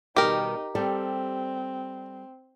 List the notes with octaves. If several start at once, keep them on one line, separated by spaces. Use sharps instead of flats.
B2 D#3 G3 D#4 G4 A#4
G3 C4 A4 D5